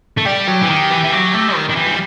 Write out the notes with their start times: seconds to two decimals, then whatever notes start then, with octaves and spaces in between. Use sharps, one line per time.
0.18 A3
0.26 G3 G4
0.48 F#3
0.62 E3
0.69 D#3
0.90 E3
1.04 E3
1.12 F#3
1.34 A3
1.55 D#3
1.69 D#3
1.76 E3
1.87 G3